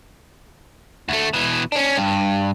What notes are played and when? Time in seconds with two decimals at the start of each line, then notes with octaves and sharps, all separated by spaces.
1.09 D2 A3
1.33 B2 E3
1.72 C#4 D4
1.97 G2